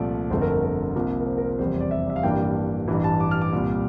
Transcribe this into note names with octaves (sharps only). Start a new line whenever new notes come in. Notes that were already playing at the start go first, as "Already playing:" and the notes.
Already playing: C2 A#2 F3 A3 D5
G1 F2 D3 A3 C5
A#4
A#4
A#4
C2 C3 F3 A#3
A#4
C5
A#4
A#4
F1 E2 C3 G3 C5
D5
E5
D5
E5
F5
A1 G2 E3 A#3 D4 G5
A1 G2 E3
A5
D6
F6
D6
C2 A#2 G3